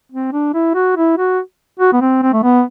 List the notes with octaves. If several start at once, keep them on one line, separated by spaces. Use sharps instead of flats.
C4
D4
E4
F#4
E4
F#4
F#4
B3
C4
C4
A3
B3